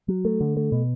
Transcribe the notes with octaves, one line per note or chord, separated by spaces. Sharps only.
F#3
A3
D3
A3
B2